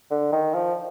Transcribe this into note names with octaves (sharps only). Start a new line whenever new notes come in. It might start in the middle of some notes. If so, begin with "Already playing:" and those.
D3
D#3
F3